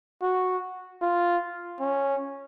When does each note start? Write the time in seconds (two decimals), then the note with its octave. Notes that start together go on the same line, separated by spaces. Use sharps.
0.22 F#4
1.02 F4
1.80 C#4